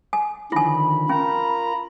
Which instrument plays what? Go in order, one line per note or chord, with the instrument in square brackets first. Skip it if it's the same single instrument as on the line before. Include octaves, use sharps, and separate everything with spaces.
[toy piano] G#5
[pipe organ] D3 D#3 F3 [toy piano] E4 G#5 [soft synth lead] B5
[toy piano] C#4 [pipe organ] F4 A#4 A#5